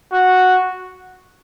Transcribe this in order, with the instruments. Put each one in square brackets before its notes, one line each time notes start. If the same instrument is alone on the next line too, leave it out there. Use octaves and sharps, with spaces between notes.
[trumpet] F#4